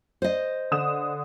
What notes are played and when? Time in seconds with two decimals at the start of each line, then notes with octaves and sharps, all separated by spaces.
0.22 C5 D#5
0.71 D3 D#6 E7